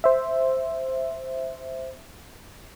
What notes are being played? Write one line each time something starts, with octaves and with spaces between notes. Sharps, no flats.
C5 E5